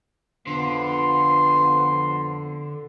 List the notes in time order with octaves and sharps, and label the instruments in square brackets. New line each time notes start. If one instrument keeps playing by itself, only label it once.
[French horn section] F2 F3 B3 [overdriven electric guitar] D3 [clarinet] C6